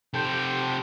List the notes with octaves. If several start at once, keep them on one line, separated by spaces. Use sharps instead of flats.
C3 G4 A4 C5 G5